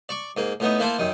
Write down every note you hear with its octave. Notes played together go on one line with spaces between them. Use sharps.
D5 C#6 D6
G#2 A#3
A2 B3 D#4
A#3 E4 F4 A4 C5
F#2 D#3